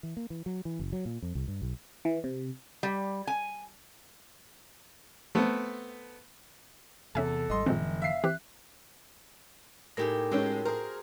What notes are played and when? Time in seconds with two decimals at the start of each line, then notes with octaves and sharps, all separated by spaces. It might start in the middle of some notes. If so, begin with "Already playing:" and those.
0.03 E3
0.17 A#3
0.30 E3
0.46 F#3
0.65 E3
0.80 F#1
0.93 F#3
1.05 A#2
1.22 F2
1.35 C2
1.48 G2
1.62 B1
2.05 E3
2.24 C3
2.83 G3
3.27 G#5
5.35 A3 B3 C4
7.15 E2 C3 C#4 A4 E5 G#5
7.50 G#1 G3 D#5 C6
7.66 F#1 A#2 D#3 F3 G#3 C4
8.02 E5 F5 C7
8.24 E3 C4 G4 F#6
9.97 A2 D#4 G4 G#4 A#4 A#6
10.31 G#3 C#4 F#4 A4 G5
10.65 G#4 A#4 C5